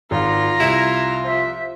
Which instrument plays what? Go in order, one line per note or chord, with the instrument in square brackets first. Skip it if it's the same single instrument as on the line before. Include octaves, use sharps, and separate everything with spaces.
[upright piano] G#1 [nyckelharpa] F4 [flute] A#5
[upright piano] C2 [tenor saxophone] E4
[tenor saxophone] F3 [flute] E5